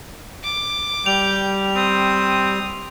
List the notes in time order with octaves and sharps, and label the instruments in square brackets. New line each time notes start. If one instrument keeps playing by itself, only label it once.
[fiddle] D6
[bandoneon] G3 [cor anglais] G5 [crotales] F7
[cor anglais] C4 [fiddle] D#6